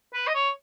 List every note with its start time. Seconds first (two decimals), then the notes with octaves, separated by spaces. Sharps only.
0.14 B4
0.27 D#5
0.34 C#5